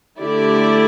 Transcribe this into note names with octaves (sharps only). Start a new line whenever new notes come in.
D3 A3 E4 G4 D5